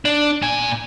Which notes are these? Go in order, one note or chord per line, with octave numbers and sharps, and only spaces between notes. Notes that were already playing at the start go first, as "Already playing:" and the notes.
D4
A#2 G#5